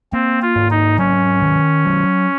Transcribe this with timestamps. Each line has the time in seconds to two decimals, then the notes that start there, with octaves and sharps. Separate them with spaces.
0.13 A#3 C4
0.42 F4
0.56 G#2
0.70 D#4
0.99 F#3 C#4
1.42 D#3
1.85 F#3